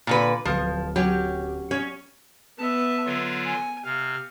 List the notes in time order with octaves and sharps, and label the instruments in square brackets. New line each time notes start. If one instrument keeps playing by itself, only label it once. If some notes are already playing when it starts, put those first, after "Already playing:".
[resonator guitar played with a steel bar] A#2 D3 B4
[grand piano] D1 B4 F6 [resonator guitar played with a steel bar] F3
[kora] F#3 C#4 [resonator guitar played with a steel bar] G4
[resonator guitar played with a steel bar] C#4 [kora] C#5
[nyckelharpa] B3 E5 [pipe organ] A5
[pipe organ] D3 F#3 F4
[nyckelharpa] G#5
[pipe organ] C3 [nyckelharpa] F5